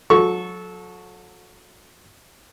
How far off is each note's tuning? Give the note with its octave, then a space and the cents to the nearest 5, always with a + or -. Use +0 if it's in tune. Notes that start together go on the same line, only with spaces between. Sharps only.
F#3 -35 A4 -20 C#6 +0